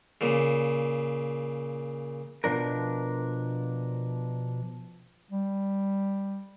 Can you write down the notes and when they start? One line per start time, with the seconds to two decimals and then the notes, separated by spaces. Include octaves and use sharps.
0.21 A#2 C#3
2.44 B2 F3 D4 A#4
5.31 G3